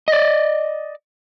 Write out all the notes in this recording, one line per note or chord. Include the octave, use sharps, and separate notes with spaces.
D5 D#5